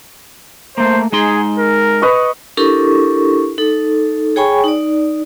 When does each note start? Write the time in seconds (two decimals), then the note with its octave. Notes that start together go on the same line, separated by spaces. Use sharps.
0.78 A3 A#3 C5
1.12 G#3 D#4 G#4 C6
1.59 A#4
2.02 B4 D#5 C#6
2.57 D4 E4 G4 A4 A#4 C#6
3.58 D#4 A4
4.36 G#4 C#5 G5 G#5 B5 C#6
4.64 D#4 D5